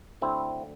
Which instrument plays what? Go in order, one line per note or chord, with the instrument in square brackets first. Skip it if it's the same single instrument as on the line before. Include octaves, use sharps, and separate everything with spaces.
[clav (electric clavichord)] D2 D3 C4 E4